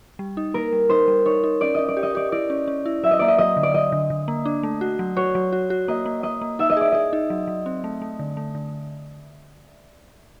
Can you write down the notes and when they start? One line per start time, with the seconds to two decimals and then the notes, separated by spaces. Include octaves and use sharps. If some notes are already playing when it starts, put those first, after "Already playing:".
0.19 G3
0.37 D#4
0.54 A#3 A#4
0.73 G3
0.89 D#4 C5
1.08 G3
1.26 D#4 C#5
1.44 D#4
1.61 C#4 D5
1.74 C#4 D#5
1.88 D5
1.97 G4
2.03 D#5
2.15 G4 D5
2.32 E4 D5
2.50 C#4
2.68 C#4
2.86 E4
3.04 F#3 E5
3.11 D#5
3.19 A#3 D5
3.28 D#5
3.38 F#3 D#5
3.57 D3
3.63 D5
3.74 F#3 D#5
3.92 D3
4.10 D3
4.28 A#3
4.45 D4
4.63 A3
4.81 F#4
4.99 F#3
5.17 F#4 C#5
5.35 F#3
5.53 F#4
5.70 F#4
5.88 A#3 D#5
6.06 A#3
6.23 A#3 D#5
6.41 A#3
6.59 D#4 E5
6.70 D#5
6.77 G#4 D5
6.92 G#4 D#5
7.13 D#4
7.30 F#3
7.48 F#3
7.66 C4
7.84 A3
8.02 A3
8.19 D3
8.37 A3
8.55 D3